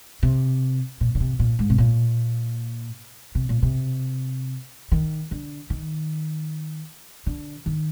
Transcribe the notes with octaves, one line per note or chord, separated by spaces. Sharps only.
C3
A#2
D3
C3
A#2
G#2
C3
A#2
C3
A#2
C3
D#3
D3
D#3
D3
D#3